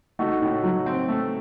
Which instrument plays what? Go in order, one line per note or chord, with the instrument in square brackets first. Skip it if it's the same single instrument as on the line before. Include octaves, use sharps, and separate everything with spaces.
[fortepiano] A3 [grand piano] D#4 F#4
[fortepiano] A2
F#3
C4
A3